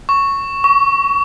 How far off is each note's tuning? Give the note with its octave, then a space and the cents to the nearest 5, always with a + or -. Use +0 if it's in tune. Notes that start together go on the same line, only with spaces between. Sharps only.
C#6 +0
C#6 +25